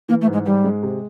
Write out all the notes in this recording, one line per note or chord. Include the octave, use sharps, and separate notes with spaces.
E3 A#3
A3
G#2
G#3
G#2 G3
G#3
C3